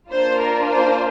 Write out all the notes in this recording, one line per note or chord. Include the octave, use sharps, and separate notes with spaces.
A#3 D4 F4 C5
A#4
C5